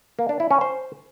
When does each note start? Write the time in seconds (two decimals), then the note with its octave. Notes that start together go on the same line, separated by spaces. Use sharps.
0.19 A#3
0.29 D4
0.40 E4
0.51 C#4
0.61 C5